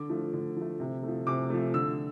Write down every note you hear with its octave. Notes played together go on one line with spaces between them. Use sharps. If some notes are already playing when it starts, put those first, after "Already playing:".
Already playing: D3 D6
F3 A3
D3
F3 A3
C3
F3 A3
C3 D6
F3 A3
D3 E6